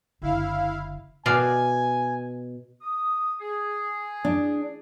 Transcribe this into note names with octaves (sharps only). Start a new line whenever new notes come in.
F#1 D3 E4 F5
B2 D5 F5 G#5
D#6
G#4
D4